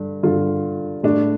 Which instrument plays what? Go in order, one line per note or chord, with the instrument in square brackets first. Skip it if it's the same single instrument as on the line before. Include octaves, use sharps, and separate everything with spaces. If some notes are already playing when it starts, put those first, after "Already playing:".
Already playing: [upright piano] G2 D3
G2 D3 F4
A2 D4